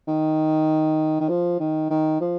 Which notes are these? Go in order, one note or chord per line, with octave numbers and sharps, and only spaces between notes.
D#3
D#3
F3
D#3
D#3
F3